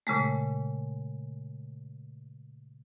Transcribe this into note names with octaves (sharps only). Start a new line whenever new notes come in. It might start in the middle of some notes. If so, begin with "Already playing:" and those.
A#2 C#3 G#3 A3